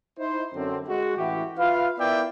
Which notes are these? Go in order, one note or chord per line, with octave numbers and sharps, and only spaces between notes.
D#4 E4 C5
F#2 D3 C4
G#3 F#4
A1 E3 E4 F#4 G4
F4 B4 E5 F5
B3 E4 A#4 D5 E5 G5